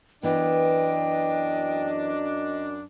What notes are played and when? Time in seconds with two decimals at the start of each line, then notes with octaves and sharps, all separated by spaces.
0.23 F#2 E3 B3 D4 D#5 G5